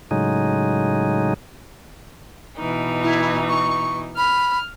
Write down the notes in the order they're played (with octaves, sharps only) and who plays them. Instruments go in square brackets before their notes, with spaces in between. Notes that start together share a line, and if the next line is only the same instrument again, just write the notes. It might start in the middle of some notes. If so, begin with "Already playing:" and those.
[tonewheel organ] A2 C#3 F#3 G#3 D#4
[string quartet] B2 E3 D#4
[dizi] E4
C#6
[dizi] B5 [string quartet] F6